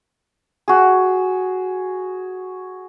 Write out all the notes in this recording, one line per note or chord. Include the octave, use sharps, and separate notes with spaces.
F#4 G#4